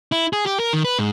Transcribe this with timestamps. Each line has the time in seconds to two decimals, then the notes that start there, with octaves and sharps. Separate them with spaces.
0.12 E4
0.33 G#4
0.46 G4
0.60 A#4
0.73 D#3
0.85 B4
0.99 G#2